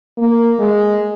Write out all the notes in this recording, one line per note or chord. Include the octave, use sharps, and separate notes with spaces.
A#3
G#3